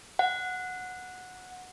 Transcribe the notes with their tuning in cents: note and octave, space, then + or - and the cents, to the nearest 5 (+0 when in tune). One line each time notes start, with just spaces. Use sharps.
F#5 -10